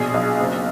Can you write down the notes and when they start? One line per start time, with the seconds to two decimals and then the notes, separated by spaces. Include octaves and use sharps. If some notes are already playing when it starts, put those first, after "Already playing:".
Already playing: A#1 B2 G#4
0.14 B1
0.40 F#1